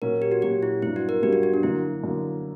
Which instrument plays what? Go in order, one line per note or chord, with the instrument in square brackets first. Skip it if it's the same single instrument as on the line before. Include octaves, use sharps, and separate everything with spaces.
[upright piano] A#2 F#3 C#4 F#4 [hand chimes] A#4
[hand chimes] G4
F#4
[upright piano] A#2 F#3 C#4 F#4 [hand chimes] G4
[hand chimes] E4
[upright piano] G2 F#3 B3 D4 [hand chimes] E4
[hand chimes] F#4
A#4
[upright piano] G2 F#3 B3 D4 [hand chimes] G4
[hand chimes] F#4
F#4
D4
[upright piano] F#2 D3 A#3 [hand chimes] E4
[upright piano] F#2 D3 A#3